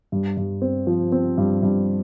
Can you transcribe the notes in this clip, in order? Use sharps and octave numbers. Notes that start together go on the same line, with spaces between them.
G2
G2
C4
F3
C4
G2
G2